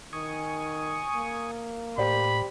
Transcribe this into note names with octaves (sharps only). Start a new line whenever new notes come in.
D#3 G#5 C#6 D#6
A#3
A2 G4 C5 D5 B5